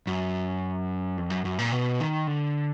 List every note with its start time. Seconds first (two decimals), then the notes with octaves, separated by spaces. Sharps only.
0.07 F#2
1.17 F2
1.30 F#2
1.45 F#2
1.59 A#2
1.72 B2
2.00 D#3
2.27 D3